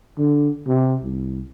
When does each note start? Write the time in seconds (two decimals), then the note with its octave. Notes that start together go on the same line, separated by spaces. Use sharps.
0.18 D3
0.68 C3
1.03 C2